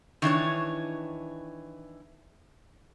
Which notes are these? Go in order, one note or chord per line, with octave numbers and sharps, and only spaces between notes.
D#3 E3 D4 C#5